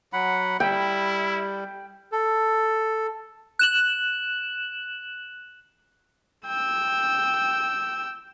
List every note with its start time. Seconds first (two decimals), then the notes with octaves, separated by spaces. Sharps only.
0.13 F#3 F#5 B5
0.60 G3 E4 G5
2.12 A4
3.59 F#6 E7 F#7
6.47 G5 E6